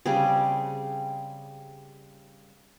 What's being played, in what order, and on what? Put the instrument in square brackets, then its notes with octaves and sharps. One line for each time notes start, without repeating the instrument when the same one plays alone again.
[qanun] C#3 G3 C4 G#4